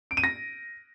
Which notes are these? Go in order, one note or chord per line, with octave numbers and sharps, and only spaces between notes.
D7
D#7
A#6